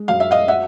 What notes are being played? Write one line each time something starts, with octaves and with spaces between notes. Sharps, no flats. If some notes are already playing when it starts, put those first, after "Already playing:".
Already playing: G#3
F#2 F5
E5
D#5 F5
E5 F#5